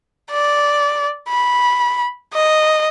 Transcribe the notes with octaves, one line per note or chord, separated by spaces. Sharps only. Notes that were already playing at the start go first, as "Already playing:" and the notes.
D5
B5
D#5